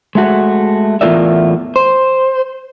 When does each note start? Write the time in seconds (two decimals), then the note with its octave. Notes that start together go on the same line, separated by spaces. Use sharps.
0.15 G#3 A3 F#4
1.01 E2 A2 F4 A#4 D5 E5
1.76 C5